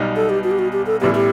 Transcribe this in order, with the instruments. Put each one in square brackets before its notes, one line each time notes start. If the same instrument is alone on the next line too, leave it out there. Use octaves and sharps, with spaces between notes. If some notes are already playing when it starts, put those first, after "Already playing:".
Already playing: [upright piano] B1 B2 G3 D#4
[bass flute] A4
G4
F#4
G4
F#4
G4
A4
[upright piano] A1 A2 G3 B3 E4 [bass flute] G4
[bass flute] G4